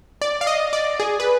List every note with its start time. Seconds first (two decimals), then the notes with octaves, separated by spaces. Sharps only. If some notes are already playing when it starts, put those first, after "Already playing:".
0.21 D5
0.41 F5
0.47 D#5
0.73 D5
1.00 G#4
1.20 B4